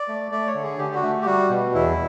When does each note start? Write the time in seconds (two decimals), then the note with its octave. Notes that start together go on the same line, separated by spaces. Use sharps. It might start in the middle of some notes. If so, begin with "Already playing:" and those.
Already playing: D5
0.08 A3
0.31 A3 D5
0.47 C#5
0.55 D3
0.63 G#4
0.78 D3 G4
0.95 F#4
1.02 A3
1.21 G4
1.26 G3 F#4
1.50 B2
1.75 E2 E4